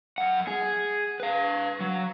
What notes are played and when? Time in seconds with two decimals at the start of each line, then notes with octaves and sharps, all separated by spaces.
0.18 F#2 F#5
0.47 G#4
1.20 B4 F5
1.81 F#3